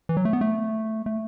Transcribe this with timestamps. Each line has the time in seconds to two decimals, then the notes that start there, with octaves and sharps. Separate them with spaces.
0.09 E3
0.17 F#3
0.25 A3
0.33 B3
0.41 A3
1.06 A3